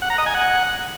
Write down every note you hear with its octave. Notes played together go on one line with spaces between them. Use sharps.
F#5
A#5
D#5
G#5
F#5